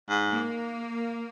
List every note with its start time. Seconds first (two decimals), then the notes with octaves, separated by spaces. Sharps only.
0.09 G#2
0.30 A#3